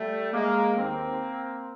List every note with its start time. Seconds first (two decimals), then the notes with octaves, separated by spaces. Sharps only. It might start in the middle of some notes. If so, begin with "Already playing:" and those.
Already playing: G3 A3
0.33 G#3 A#3
0.75 D#2 D#3 A#3 C4